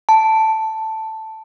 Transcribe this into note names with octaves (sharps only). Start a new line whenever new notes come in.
A5